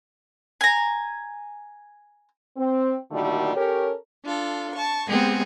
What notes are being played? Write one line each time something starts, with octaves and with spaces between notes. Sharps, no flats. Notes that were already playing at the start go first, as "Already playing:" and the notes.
G#5 A#5
C4
A#2 D3 D#3 G3 A3 F#4
C#4 G4 A4 A#4 C#5
D4 F4 A4
A5 C#6
G#3 B3 C4 G4 G#4